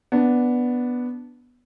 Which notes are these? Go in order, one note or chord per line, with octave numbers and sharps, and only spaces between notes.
B3 D4